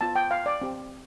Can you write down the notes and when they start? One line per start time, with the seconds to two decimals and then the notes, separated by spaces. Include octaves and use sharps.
0.01 B3 F4 A5
0.16 G5
0.31 F5
0.46 D5
0.61 C4 G4